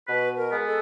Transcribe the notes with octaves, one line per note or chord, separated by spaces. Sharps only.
B2 B4
A#4
G#3 B3
A4